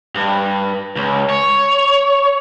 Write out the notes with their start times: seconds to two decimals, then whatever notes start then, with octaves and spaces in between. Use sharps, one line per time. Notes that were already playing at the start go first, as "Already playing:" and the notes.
0.15 G2
0.96 C#2
1.30 C#5